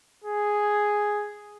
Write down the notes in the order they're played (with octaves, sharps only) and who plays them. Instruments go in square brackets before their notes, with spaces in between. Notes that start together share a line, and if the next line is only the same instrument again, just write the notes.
[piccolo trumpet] G#4